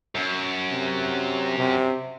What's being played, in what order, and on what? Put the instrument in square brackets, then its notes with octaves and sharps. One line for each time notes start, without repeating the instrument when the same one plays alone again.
[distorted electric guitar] F#2
[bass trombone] C3
C3